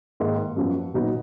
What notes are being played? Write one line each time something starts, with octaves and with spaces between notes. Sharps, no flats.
G#2 D#3 A#3
F#2 F3 B3
A#2 F#3 B3 D#4 F#4